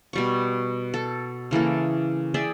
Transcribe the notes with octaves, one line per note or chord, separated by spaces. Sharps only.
B2 G3 C#6
A4
C#3 E3 A#3 A4
G#4 D5 E5 G5